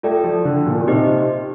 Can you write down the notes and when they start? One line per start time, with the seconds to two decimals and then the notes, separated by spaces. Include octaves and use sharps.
0.03 A3 F4 A4 D5 G5
0.24 F3
0.45 D3
0.66 A#2
0.81 A#2
0.87 C3 D#4 G4 C5 D#5